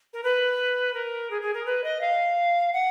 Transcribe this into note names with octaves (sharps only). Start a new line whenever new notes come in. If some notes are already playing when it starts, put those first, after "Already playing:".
A#4
B4
A#4
G#4
G#4
A#4
B4
D#5
F5
F#5